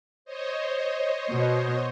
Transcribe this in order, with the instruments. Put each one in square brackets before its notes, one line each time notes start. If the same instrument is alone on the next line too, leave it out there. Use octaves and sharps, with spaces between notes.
[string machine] C5 C#5 D#5
[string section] B2